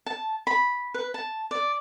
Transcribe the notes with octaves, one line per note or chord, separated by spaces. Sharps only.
A5
B5
B4
A5
D5